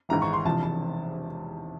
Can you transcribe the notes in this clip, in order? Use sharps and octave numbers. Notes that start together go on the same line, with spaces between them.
G#1 G#2 E3 A#5
C#6
C6
E1 E2 C3 F3 A5
A5